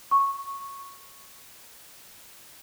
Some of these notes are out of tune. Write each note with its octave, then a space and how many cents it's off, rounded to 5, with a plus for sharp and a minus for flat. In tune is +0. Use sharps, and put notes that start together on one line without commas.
C#6 -10